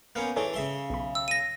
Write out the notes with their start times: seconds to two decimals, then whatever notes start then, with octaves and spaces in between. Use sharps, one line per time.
0.15 A#3 B3 C#4 F6 G6
0.36 E3 D4 G#4 A4 C#5
0.54 C#3 E5 C6
0.90 B1 B5
1.15 E6
1.28 A#6 D#7